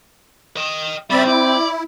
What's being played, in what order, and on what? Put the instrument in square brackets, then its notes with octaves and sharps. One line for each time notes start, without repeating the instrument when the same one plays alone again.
[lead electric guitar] D#5 G5
[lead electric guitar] C#3 G3 [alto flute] C4 [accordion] D5 E5 B5
[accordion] E4 [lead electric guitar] D5